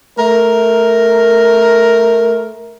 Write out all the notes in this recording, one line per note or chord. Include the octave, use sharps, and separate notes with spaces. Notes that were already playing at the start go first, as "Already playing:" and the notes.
A3 A#4